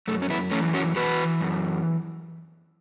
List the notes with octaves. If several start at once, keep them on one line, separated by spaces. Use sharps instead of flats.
F#2 A3
C#4
B3 E4
E3 A3 C#4
C#4 F#4
E3 F#4 B4
F#2